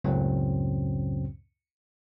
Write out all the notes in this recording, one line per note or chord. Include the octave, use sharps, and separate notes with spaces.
C#2 F#2 A2 C#3 F#3 C4